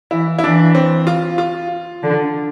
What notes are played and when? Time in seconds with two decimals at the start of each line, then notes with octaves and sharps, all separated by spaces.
0.11 E3 E4
0.39 E4
0.44 E3 D4
0.75 C4
1.07 F4
1.38 F4
2.03 D3